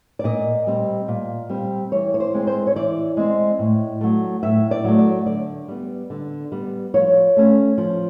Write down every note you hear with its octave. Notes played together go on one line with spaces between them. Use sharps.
D5
A#2 D#5
G3 C4
A#2
G3 C4
E3 C#5
C#5
C5
G#3 C4
C5
C#5
E3 D5
G#3 C4
A2
F#3 A3
A2 E5
D5
F#3 A3
D5
D3 D5
G3 B3
D3
G3 B3
F3 C#5
A3 C#4
F3